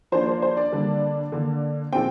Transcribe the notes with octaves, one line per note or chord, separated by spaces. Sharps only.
F3 A#3 D4 C5
C5
C5
D5
D3 G3 A#3 D4
D3 A#3 D4
A#2 F3 C4 G5